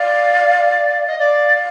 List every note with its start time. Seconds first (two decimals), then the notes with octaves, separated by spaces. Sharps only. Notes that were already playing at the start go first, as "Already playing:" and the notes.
Already playing: D5 F5
1.07 D#5
1.19 D5 F5